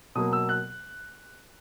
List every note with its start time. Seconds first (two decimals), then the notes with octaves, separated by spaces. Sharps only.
0.15 B2 F#3 A#3 D#6
0.33 E6
0.49 F#6